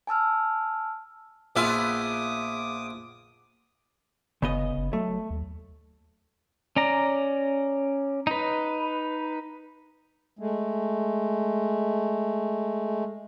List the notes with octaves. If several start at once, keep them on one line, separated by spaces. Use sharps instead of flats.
G#5 A5 E6 F6
A#1 B3 F4 G#4 E5 D6 D#6
F#1 C#3 B3 D#5
F#1
F#3 A3
D#2
C#4 D5 A#5
D#4 B4
G#3 A3